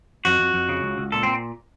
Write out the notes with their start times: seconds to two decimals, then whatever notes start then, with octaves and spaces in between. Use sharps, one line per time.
0.25 F2 F#4
0.40 F2
0.54 F2
0.69 C#3
0.83 C#2
0.98 C#2
1.12 A#2 A4
1.23 A#2 C4